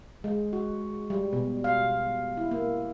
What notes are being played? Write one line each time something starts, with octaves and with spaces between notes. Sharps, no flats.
G#3
F#4
G3
B2
F5
E4
A#3